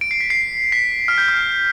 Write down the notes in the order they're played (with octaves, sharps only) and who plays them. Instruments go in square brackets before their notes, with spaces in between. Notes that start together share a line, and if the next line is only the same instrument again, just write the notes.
[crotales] D7
C7
B6
C7
B6
F6
G6
F6